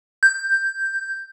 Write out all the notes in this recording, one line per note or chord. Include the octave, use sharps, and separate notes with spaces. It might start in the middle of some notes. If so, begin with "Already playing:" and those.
G6